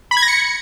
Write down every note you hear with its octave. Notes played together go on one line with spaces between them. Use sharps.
B5
G#6
A#6
C#7